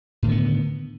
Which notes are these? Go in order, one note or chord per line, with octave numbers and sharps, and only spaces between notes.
A2 D3 D#3 B3